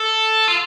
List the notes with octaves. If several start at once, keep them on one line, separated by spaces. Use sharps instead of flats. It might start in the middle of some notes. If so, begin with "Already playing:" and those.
Already playing: A4
F4